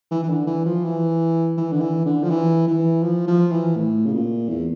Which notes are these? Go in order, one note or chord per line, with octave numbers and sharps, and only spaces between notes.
E3
E3
D3
E3
F3
E3
E3
D3
E3
D3
F3
E3
E3
F3
F3
E3
A2
C#3
A#2
E2